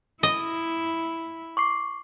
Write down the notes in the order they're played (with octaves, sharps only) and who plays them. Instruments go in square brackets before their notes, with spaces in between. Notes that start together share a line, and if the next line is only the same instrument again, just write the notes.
[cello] E4 [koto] D#5
[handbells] C#6 D6 C7